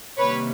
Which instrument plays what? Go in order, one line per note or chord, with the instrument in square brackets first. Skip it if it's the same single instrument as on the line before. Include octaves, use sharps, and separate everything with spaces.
[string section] C3 D#3 G3 A#3 B4 C#5